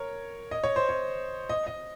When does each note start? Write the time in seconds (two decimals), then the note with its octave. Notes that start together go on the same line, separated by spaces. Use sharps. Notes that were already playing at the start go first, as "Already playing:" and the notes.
Already playing: A#4 C#5
0.51 D#5
0.64 C#5
0.76 C5
0.89 C#5
1.49 D#5
1.67 D#5